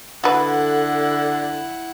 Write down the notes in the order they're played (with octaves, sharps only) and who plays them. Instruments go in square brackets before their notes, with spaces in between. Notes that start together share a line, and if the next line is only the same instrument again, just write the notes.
[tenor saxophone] D3 [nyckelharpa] E4 F#5 [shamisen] F#4 B4 [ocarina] A4